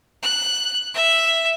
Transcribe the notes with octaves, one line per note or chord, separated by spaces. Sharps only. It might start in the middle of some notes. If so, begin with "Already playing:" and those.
F#6
E5